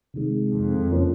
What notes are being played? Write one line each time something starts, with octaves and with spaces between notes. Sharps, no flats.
C3 D#3 G#3
F2
C#3 F3 A#3 C#4